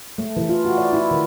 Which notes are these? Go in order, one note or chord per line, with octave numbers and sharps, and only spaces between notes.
A3
E3
F4
F#4
D5
E4
D#3